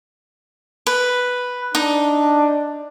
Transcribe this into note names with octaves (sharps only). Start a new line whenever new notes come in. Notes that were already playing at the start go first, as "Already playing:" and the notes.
B4
D4 D#4